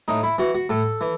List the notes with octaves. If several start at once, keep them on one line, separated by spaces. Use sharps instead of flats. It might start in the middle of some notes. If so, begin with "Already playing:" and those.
A2 D#4
E4
E3 F#4
F#4
A2 A4
E3